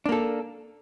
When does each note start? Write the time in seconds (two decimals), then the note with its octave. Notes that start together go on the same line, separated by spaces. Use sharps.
0.06 D4
0.09 A#3
0.12 A4